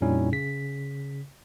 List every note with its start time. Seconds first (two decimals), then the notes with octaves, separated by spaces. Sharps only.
0.01 F2 A#2 G3 C#4 D#4 E4
0.32 C#3 B6